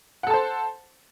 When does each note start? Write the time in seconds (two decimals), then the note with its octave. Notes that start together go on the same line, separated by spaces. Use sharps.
0.23 F#5
0.27 A4
0.30 A5
0.34 C5